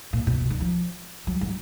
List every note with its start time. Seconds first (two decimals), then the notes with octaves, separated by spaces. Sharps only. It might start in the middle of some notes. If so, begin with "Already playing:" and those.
0.13 A#2
0.27 B2
0.41 C#3
0.50 D#3
0.60 F3
1.27 F#3
1.41 F#3